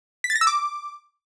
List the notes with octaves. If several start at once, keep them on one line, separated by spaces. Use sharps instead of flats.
B6
A6
A#6
E6
D6